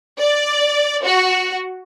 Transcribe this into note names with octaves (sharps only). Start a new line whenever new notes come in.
D5
F#4